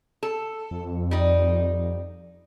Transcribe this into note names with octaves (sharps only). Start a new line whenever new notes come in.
A4
F2
G3 D#4